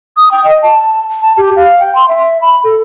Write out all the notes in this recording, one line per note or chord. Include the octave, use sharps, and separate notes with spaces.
D#6
G5
D#5
A5
A5
G4
F5
G5
C6
E5
B5
A4